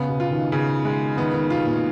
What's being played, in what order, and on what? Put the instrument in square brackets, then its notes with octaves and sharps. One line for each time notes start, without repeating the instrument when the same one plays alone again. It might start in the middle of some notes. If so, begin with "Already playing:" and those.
Already playing: [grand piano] C#3 [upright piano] B3
[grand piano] B2
[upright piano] F4
[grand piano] D#3
[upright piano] C#3
G#3
[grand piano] D#3 [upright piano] B3
[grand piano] D#3
[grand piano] B2 [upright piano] F4
[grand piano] A#2